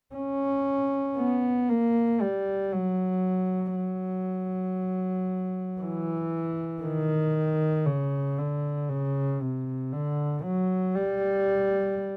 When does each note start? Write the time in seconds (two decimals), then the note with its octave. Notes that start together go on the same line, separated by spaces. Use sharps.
0.15 C#4
1.18 B3
1.70 A#3
2.22 G3
2.73 F#3
3.76 F#3
5.81 E3
6.83 D#3
7.86 C#3
8.39 D3
8.89 C#3
9.41 C3
9.92 D3
10.43 F#3
10.95 G3